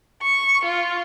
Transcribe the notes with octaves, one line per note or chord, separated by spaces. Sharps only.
C#6
F4